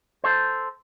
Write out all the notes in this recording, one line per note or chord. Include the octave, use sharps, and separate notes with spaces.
A4 C5